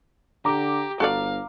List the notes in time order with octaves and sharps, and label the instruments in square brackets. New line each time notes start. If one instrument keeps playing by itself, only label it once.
[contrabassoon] D3 [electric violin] G4 [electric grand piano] A#5 D6
[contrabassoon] G1 [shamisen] F#4 A4 D5 [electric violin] F5